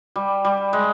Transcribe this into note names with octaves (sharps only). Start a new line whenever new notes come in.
G3
G3
G#3